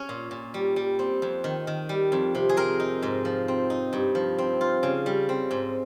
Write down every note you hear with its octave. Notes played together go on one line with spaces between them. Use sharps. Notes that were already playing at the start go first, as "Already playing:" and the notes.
Already playing: C#4 C#5
A#2
A#2
G3
G3
C4
F2
D#3
D#3
G3
F2
C3
G#4
C4 A#4
D#4
G#2
F3
C4
D#4
G2
F3
C4
F4
C#3
G3
C4
G#2